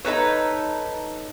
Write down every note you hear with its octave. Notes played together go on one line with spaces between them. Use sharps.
D#4 A4 B4 C#5